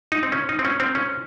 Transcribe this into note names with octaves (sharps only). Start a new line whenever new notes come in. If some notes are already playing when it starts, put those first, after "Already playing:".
D#4
C4
C#4
D#4
C4
C#4
C4
C#4